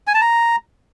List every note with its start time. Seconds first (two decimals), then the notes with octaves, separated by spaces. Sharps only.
0.07 G#5
0.14 A5
0.21 A#5